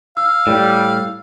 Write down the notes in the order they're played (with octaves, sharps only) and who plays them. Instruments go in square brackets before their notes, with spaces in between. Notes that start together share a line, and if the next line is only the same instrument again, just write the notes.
[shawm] F5 [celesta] E6
[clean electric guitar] A2 [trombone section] G3